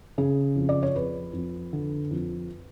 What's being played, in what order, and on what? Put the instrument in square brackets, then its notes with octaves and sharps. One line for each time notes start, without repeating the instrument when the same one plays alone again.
[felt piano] C#3 G#4
F2
D5
C#5
F2 B4
F2
D3
F2